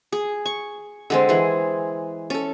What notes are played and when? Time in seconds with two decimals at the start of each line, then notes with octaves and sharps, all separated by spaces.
0.12 G#4
0.46 C#6
1.10 D3 G#3 C4
1.29 E3 G#4
2.30 C#4 A4